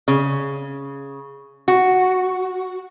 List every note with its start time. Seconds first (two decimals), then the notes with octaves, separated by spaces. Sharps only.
0.08 C#3
1.68 F#4